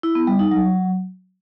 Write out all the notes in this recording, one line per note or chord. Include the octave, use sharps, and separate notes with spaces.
E4
B3
G3
D#4
F#3